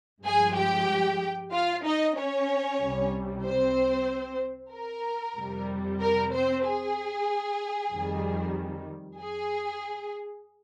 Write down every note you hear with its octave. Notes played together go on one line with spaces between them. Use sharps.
G2 F3 G#3 G#4 G#5
G4 G5
F4 F5
D#4 D#5
C#4 C#5
C2 C3 G3
C4 C5
A#4
F2 C3 G3
A#4
C4 C5
G#4
F2 D#3 G3
G#4